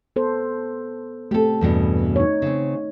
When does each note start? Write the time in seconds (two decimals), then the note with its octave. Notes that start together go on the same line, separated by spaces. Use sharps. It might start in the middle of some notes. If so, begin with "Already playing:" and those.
0.16 B3 A4 C5
1.31 A3 C4 G4 A4
1.61 E2 G2 B2
2.16 D#4 C#5
2.42 C#3 C4